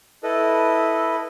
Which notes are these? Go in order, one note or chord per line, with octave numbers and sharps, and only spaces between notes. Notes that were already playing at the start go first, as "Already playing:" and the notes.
E4 A4 B4 D#5